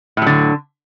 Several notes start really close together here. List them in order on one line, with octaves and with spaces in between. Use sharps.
A2 F#3 D3